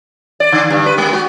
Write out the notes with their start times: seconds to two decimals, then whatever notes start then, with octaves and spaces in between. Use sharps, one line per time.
0.40 D5
0.52 D3
0.70 G2
0.86 B4
0.98 G#3
1.13 F#4